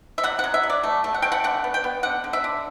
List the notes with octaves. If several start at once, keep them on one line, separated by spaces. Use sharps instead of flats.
E5
C3 F#5
F#5
F#3
E5
F#3
D5
A3
A3
F#5
A3 G5
F#5
D3 F#5
B3
G5
B3
D3 F#5
D3
E5
D3